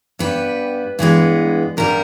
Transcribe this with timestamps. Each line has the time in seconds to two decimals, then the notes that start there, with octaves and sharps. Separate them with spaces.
0.19 G2 G3 B3 B4
0.99 G2 E3 G#3 B3
1.77 G2 G3 B3 A#4